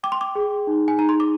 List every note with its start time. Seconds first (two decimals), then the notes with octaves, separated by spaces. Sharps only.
0.03 G5 D6
0.12 C6
0.21 D6
0.35 G#4
0.67 D#4
0.88 G#5
0.98 D#4 A#5
1.09 C6
1.20 D6